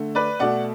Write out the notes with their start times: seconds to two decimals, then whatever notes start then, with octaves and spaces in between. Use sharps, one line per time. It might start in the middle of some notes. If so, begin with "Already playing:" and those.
Already playing: D3 A3
0.15 B4 D5
0.40 B2 A3 D5 F#5